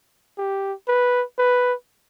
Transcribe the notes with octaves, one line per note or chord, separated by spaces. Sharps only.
G4
B4
B4